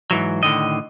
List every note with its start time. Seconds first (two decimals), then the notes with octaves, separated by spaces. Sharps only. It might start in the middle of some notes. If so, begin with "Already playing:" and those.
0.11 G#2 E3 F#3
0.43 A2 D3 D#3 D#5